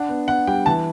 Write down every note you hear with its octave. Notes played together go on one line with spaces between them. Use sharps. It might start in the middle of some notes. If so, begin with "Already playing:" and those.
Already playing: D4 F#5
B3
B3 F#5
G3 G5
E3 A5